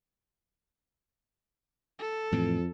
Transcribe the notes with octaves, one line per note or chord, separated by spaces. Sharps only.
A4
F2 A2 E3 C4